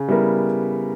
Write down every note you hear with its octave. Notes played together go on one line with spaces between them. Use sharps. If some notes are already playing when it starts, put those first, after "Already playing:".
Already playing: C#3
G3 B3 E4 A#4